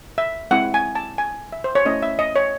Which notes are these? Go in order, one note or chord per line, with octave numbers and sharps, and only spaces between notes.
E5
G#3 C4 E4 F#5
G#5
A5
G#5
E5
C5
C#5
A3 C#4 E4 D#5
E5
D#5
C#5